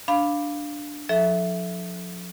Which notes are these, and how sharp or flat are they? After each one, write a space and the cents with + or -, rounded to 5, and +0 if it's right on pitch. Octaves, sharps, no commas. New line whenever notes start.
D4 +0 F5 +0 B5 +0
F3 +45 A4 -20 E5 +0